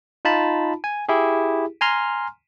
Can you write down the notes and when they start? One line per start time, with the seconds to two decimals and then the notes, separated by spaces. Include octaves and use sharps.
0.25 D#4 F4 A5 B5
0.84 G#5
1.09 E4 G4 G#4
1.81 G#5 A#5 C6 F6